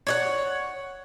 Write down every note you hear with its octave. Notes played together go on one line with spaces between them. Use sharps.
C#5 D5 F#5